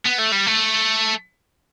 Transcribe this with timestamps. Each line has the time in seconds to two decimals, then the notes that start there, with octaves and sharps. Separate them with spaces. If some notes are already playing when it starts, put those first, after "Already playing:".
0.06 B3
0.19 A3
0.32 G3
0.47 A3